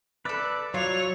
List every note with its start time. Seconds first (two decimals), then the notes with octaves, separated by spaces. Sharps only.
0.25 A4 B4 D5 E5
0.74 F#3 F4 C#5 D5 F7